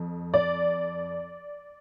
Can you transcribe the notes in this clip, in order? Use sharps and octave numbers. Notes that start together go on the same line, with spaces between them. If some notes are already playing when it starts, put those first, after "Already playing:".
Already playing: F2
D5